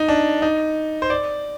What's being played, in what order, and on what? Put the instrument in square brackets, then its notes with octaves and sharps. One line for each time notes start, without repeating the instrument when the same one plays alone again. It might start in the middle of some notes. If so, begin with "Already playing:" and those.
Already playing: [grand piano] D#4
D4
D#4
C5
D5